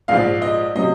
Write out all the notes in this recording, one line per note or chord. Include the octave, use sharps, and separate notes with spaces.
A#1 G#2 F3 F5
D#5
C3 F#3 D#5